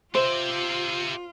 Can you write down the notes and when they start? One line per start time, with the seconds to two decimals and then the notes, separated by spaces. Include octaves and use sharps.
0.15 F4 G4 C5 E5